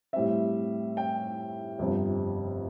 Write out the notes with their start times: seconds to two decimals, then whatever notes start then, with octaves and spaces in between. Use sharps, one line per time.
0.13 A2 G3 C4 E5
0.97 G5
1.79 G1 F2 C3 G3 C4